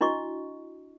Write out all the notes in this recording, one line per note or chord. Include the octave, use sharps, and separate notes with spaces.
D4 E4 F#4 D#5 C#6